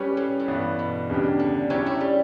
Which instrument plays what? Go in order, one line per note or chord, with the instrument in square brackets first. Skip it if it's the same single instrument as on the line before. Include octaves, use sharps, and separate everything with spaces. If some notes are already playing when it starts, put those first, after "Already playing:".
Already playing: [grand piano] G3 C#4 G4 B4
[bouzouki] A2
A2
[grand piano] G2 E3 B3 D4
[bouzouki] B2
[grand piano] E2 C#3 G3 D4 G4
[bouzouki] D3
[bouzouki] F#3 [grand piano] G3 C#4 E4 G4 C#5
[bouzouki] A3
G3